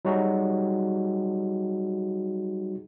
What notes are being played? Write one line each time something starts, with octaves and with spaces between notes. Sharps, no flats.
F#3 G3 D#4 F#4 G#4